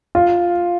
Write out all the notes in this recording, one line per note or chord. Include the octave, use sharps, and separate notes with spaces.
F4